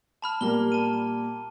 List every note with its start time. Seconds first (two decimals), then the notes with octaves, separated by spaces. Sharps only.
0.22 A5 B5 F6
0.41 A#2 G3 A#3 A#5 F6 G7
0.72 A5 D#7